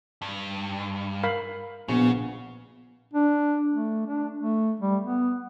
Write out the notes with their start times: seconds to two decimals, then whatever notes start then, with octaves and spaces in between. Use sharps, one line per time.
0.22 G2
1.23 A#4 F5 B5
1.89 A#1 C#3 B3
3.14 D4
3.70 A3
4.07 D4
4.38 A3
4.80 G3
5.01 B3